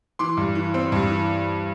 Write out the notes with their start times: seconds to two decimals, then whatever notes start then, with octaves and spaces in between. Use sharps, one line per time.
0.19 E3 C6 D6
0.37 G2
0.55 E3
0.74 C4
0.92 G2
1.10 E3